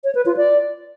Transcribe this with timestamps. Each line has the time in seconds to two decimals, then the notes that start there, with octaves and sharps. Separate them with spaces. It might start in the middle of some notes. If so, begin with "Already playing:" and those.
0.04 C#5
0.15 B4
0.26 F4
0.37 D5